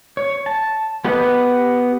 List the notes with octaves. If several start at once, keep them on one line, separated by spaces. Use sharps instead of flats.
C#5
A5
B3 G4 B4 D#5